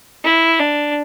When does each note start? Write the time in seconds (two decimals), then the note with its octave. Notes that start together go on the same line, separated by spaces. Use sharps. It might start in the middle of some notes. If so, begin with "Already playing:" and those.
0.24 E4
0.59 D4